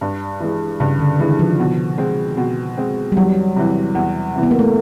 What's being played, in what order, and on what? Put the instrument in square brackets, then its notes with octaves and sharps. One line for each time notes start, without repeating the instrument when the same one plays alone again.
[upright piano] G2
E3 G#3
[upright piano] G2 [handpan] C#3
[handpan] D3
[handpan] D#3 [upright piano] E3 G#3
[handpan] F3
[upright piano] B2
G#3 C4
B2
G#3 C4
[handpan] G3
[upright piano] E2 [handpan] F#3
[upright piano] C3 E3
E2
C3 E3
[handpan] B3
A#3
A3